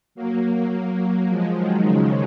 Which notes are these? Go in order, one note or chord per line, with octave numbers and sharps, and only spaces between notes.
F#3 A#3
F3 G#3
D#3 F#3
C#3 F3